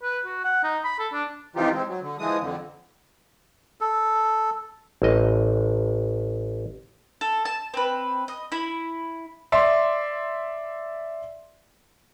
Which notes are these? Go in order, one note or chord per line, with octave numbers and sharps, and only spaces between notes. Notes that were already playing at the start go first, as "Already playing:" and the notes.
B4
F#4
F#5
D#4
B5
A4
D4
C3 E3 F3 D#4 F4 G4
G#3 C4
F#3
D3
E3 F3 G#3 D#6
F2 D3
A4
A1 D#5
A4
A5
C4 B4
D#5
E4 B5
D5 E5 C6